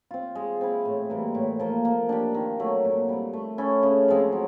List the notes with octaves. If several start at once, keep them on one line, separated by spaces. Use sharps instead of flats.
C4 F4
G#3
C4 E4
A2
E3 G3 A#3
A2
F3 A#3
A#3
D4 G4
D#3
F#3 A3
A#2
G3 C4
A3
C#4 E4 A4
C#3
F3 G#3 C4
F#3